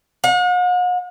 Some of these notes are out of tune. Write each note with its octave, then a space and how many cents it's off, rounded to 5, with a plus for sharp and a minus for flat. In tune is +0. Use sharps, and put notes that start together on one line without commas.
F#5 -45